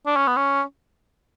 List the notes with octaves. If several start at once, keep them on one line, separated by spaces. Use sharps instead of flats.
D4
C#4
B3
C#4